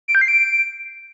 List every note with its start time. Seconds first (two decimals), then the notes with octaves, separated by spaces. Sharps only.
0.08 D7
0.15 G6
0.21 C7
0.28 D7